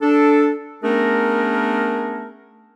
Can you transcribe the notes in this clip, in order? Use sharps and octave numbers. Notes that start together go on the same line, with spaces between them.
D4 A4
A3 B3 C#4 D4 G#4 A#4